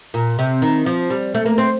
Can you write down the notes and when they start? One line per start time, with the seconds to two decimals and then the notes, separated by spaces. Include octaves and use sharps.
0.14 A#2
0.39 C3
0.62 D#3
0.86 F3
1.10 G3
1.34 A3
1.46 A#3
1.58 C4